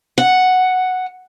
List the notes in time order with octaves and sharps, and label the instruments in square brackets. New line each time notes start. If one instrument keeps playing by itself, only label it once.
[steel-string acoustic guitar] F#5